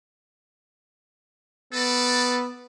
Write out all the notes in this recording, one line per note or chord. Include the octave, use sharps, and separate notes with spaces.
B3 A4 B4 D5